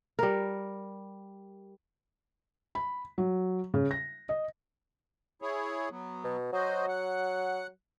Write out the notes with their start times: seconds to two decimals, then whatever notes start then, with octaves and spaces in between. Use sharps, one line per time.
0.19 G3 A#4
2.75 B5
3.18 F#3
3.74 C#3
3.91 A#6
4.29 D#5
5.42 E4 G#4 C#5
5.91 F#3 B3
6.24 B2
6.53 F#3 F#4 C5 D#5
6.88 F#5